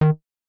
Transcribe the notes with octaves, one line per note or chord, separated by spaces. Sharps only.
D#3